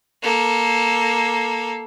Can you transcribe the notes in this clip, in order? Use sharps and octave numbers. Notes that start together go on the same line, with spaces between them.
A#3 A4